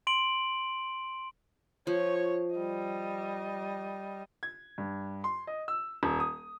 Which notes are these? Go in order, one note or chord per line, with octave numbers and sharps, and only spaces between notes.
C6 D7 F#7
F3 C#5
G3 D#5
G#6
G2
C6
D#5
E6
D#1
D#6